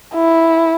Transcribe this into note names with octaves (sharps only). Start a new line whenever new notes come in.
E4